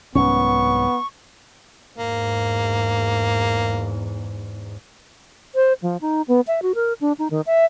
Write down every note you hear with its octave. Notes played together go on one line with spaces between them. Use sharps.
C2 G#2 F#3 B3 C#4 C#6
E2 G#2 A#3
C5
F3
D#4
B3
E5
F#4
A#4
D4
D#4
D#3
E5